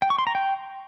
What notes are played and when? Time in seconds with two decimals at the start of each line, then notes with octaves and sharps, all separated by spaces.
0.02 G5
0.10 C#6
0.18 C6
0.27 A#5
0.35 G5